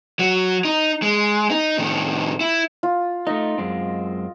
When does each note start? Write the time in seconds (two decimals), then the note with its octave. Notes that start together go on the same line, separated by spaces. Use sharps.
0.19 F#3
0.65 D#4
1.02 G#3
1.51 D#4
1.78 A2 D#3
2.41 E4
2.83 F4
3.27 A3 D#4 D#5
3.58 F#2 G#3 C4